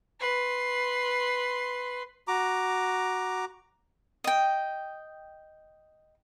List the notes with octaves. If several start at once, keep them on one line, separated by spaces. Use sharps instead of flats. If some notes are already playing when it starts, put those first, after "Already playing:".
B4 C6
F#4 A#5 D6
D#5 G5